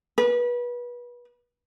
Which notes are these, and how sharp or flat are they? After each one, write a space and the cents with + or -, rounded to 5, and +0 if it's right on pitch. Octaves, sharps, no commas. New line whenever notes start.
B4 -30